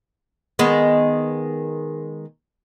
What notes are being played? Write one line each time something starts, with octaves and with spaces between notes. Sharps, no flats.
D#3 G#3 B3